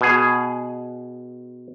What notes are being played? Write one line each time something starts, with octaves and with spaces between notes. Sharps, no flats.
B2 G#4